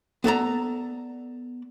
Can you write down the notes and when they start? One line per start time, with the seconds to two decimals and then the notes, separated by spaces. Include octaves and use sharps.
0.24 B3 A4 D5 A#5